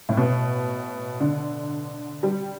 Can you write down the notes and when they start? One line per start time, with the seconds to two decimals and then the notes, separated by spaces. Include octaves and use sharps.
0.09 A2
0.17 B2
1.20 D3
2.23 G3